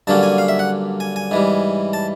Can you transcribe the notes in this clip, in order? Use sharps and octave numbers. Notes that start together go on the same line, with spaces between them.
G2 D3 F#3 A#3 C#4 A5
G#5
F5
E5
F#5
G#5
G#5
G#2 E3 G3
A5